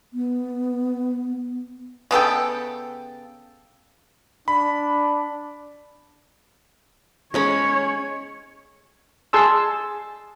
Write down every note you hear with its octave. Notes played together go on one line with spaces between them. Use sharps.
B3
C#3 B3 A4 G5
D4 B5
G#3 C#4 C#5 B5
G#4 A5 C6 E6